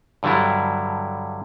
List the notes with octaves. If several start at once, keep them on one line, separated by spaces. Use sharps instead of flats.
G2 D3 F#3 G3 E4